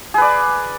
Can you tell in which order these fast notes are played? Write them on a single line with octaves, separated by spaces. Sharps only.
G#4 B4 D5